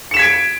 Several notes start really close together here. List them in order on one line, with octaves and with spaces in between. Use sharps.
C#7 E7 B6 G#6 D7